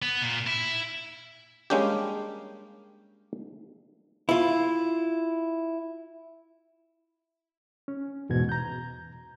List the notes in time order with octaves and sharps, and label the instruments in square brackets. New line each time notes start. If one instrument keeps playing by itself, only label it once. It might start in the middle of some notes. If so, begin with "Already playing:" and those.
[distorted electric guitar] B3
A#2
E4
[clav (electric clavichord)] G3 G#3 A#3 C#4 D4 G4
[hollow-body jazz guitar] E4 F4
[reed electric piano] C#4
E2 G#2 B2 F#4 G#6
A#5 G6